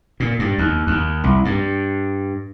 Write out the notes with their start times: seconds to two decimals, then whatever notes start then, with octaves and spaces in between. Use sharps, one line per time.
0.20 A#2
0.39 G2
0.58 D#2
0.87 D#2
1.24 C2
1.45 G2